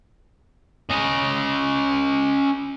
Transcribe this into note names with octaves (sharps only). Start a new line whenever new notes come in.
C#4 D#5